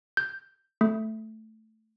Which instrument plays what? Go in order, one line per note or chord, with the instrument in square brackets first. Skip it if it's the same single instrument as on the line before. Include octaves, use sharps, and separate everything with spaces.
[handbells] G6
A3